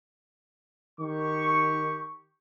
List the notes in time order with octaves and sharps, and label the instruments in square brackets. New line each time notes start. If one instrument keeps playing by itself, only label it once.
[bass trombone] D#3 [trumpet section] G4 C#6